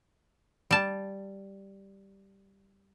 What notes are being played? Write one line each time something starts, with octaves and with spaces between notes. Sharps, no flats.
G3 A5